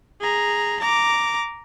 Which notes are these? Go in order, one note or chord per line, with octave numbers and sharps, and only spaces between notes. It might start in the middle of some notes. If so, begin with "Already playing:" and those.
G#4 A#5
A#5 D6